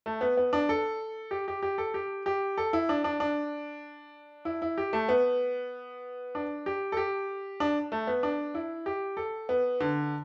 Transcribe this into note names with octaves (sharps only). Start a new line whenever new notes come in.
A3
B3
B3
D4
A4
G4
G4
G4
A4
G4
G4
A4
E4
D4
D4
D4
E4
E4
G4
A3
B3
D4
G4
A4
G4
D4
A3
B3
D4
E4
G4
A4
B3
D3